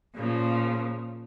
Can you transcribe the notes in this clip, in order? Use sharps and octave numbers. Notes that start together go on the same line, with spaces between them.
A#2 C#3 F3